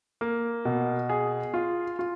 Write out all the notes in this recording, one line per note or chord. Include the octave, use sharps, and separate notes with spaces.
A#3
B2
G#4
F4
F4